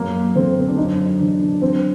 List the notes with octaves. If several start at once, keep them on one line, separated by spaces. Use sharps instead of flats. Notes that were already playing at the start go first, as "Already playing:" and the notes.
Already playing: F#2 A#3
D3 C4
C4
D4
F#2 D#4
D3 D4
D4
F#3 C4